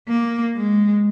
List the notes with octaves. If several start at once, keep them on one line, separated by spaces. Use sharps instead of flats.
A#3
G#3